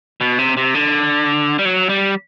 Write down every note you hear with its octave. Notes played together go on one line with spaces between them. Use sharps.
B2
C3
C3
D3
G3
F#3
G3